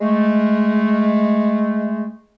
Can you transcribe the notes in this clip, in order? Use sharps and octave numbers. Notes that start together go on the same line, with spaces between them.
G#3 A3